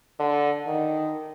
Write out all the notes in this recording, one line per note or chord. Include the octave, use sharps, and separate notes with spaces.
D3
D#3